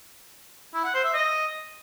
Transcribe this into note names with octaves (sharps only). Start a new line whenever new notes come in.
E4
F#5
C5
E5
D#5